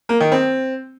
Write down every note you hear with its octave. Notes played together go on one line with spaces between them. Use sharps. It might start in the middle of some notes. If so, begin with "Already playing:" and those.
A#3
D#3
C4